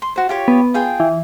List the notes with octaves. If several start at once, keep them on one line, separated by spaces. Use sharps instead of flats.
C6
F#4 C5
F4 G4 C#5
B3
F4 G#4 G5
E3